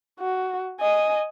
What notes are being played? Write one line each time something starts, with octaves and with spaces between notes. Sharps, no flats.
F#4
D#5 G#5